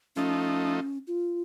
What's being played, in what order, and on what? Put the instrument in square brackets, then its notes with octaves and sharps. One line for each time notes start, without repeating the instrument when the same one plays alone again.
[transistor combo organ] F3 A3 D#4 [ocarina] C#4
[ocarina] F4